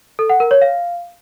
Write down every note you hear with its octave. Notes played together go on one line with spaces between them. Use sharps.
A4
F#5
A#4
C#5
F5